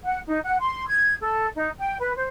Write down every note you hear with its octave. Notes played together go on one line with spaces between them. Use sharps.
F#5
D#4
F#5
C6
G#6
A4
D#4
G5
B4
C5